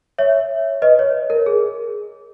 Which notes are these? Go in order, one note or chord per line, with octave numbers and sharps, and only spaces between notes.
C#5 E5
B4 D#5
C#5
A#4
G#4